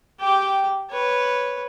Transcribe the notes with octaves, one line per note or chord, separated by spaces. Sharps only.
G4 G5
B4 C#5